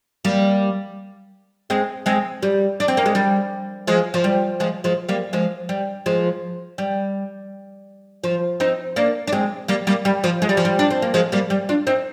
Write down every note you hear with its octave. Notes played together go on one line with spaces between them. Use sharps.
G3 A#3
G#3 C4
G#3 C4
G3
D4
C4
A#3
G#3
G3
F3 G#3
F3
G3
F3 G#3
F3 G#3
G3 A#3
F3 G#3
G3
F3 G#3
G3
F3
C4 D#4
A#3 D4
D4
G#3 C4
G3 A#3
G3 A#3
G3
F3
G#3
G3
F3
G3
D4
C4
A#3
F3 G#3
G3 A#3
G3
D4 F4
C4 D#4